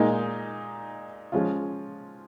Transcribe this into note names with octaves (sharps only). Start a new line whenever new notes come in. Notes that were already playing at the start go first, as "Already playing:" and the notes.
Already playing: A#2 G#3 D#4 A#4 D#5
F3 G#3 C#4 F4